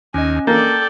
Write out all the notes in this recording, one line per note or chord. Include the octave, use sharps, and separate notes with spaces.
D#2 C#4 D#5 G#5
A#3 A4 D5 G5 A5